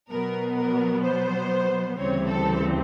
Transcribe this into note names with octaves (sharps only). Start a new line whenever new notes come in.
B2 F#3 B3 A#4
A#4
C5
D2 C#3 E3 G3 C4 C#5
A4